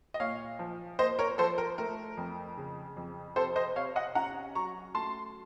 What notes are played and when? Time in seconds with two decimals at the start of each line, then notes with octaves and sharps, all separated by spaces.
0.14 D#5
0.20 A#2 C#5 F5
0.59 F3
0.99 A#3 C5 D#5
1.19 A#4 C#5
1.38 F3 A4 C5
1.58 A#4
1.78 A3 A#4
2.17 F2
2.57 C#3
2.97 F2
3.36 C3 A4 C5
3.56 C5 D#5
3.76 C3 C#5 F5
3.96 D#5 F#5
4.15 C#4 F#5 A#5
4.55 F#3 A#5 C#6
4.94 A3 A5 C6